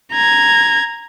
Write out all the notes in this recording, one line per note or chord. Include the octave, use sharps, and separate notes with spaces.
A#5 G#6